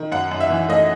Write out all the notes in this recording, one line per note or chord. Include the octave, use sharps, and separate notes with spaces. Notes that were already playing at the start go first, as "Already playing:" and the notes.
Already playing: D#3
F#2 F#5
F#2
E5
E3
A3 D#5